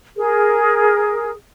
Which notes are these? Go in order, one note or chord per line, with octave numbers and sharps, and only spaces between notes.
G#4 A#4